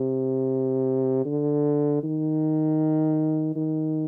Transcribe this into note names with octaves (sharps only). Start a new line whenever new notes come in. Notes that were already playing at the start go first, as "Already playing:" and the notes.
Already playing: C3
D3
D#3
D#3